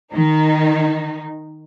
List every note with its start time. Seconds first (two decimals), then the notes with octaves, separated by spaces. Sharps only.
0.13 D#3 D#4